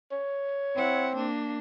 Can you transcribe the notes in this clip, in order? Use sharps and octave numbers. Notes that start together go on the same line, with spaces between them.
C#5
C4 E4 F#5
A#3 D4